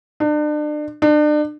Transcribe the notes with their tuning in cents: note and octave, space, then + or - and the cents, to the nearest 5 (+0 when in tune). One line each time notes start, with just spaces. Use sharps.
D4 +35
D4 +35